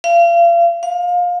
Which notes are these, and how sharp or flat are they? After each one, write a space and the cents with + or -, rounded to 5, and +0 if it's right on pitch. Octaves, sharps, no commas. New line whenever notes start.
F5 -40
F5 +25